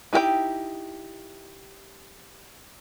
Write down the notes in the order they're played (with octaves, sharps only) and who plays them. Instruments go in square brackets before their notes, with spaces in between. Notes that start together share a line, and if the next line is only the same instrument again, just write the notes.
[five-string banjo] D#4 E4 F#4 G4 G5